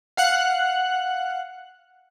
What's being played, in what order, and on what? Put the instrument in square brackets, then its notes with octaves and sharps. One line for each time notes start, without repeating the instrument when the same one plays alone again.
[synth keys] F5 F#5 F#6